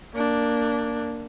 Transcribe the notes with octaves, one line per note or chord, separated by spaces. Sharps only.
A#3 D4